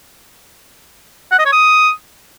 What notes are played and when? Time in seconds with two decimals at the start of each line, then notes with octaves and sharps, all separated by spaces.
1.32 F#5
1.39 D#5
1.46 C#5
1.52 D#6